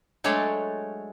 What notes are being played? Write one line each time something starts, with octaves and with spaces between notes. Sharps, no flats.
F#3 G#3 A3 D4 C#5